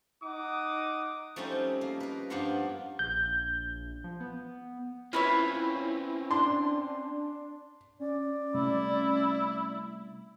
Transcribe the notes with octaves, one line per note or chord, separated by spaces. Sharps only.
D#4 F#5 D6 D#6
F3 G3 A3 C4 C#4 D#4
A#3
A#4 B4
G2 F3 A#3 B3 F4 F#5
A#1 G6
F3
B3
C4 C#4 E4 F4 B4 C#5
D4 C6
C#4 D5
C3 G3 A3 E4